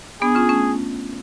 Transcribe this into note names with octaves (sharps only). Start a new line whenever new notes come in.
B3 D4 G#4
C#4 F4
A3 C#4